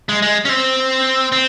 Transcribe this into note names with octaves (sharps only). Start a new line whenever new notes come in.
G#3
G#3
C#4
C4
C4